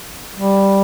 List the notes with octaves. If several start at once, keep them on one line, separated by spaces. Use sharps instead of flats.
G3